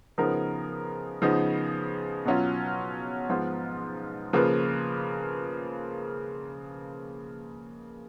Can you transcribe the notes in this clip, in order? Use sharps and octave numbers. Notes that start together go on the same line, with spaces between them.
C#3 F3 B3 D#4 A#4
C#3 F3 B3 D#4
B2 F#3 C#4 F4
G#2 F3 B3 F4
C#3 F3 A#3 F4 B4